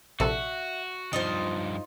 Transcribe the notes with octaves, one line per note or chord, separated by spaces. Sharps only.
A#1 C3 F#4 A4 E5
G2 F3 D#4 F4 C5